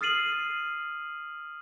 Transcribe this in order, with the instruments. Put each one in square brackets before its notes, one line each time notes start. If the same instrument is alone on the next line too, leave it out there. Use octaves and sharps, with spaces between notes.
[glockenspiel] D#6 F6 A6 C7 D#7 F#7